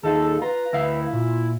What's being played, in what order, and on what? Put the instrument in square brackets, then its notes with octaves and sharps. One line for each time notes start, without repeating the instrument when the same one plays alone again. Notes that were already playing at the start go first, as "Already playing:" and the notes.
[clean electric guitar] D#2 D#4 F4 [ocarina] G#4 [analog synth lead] A4
[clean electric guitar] F4 [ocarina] B4 [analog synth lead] A#5
[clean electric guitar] D2 F5 [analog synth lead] E4
[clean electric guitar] A#2 [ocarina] F4